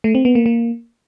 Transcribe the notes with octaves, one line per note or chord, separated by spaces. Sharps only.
A3
C4
B3
A#3
A#3